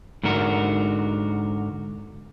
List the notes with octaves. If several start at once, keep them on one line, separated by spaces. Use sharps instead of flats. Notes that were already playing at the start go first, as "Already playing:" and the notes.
G#2 D3 F#4 A#4